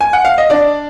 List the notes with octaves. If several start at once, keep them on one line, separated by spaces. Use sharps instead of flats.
G#5
F#5
F5
D#5
D4 D5